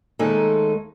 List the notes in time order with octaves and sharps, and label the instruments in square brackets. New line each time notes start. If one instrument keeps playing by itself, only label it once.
[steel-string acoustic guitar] D#2 G#3 A3 D#4 A4